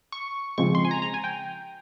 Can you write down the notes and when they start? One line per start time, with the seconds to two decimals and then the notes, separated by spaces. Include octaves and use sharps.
0.12 C#6
0.58 C#3 F3 G#3 C4 C#6
0.75 C6
0.85 G#5
0.91 A#5
1.02 A#5
1.14 G#5
1.24 G5